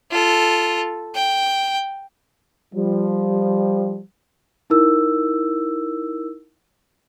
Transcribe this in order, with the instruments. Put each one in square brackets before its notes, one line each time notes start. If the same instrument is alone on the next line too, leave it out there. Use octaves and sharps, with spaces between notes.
[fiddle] F4 A4
G5
[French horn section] F3 G3
[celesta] D#4 E4 A#4 E6